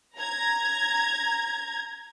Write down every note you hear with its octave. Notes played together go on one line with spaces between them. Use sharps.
A#5 G#6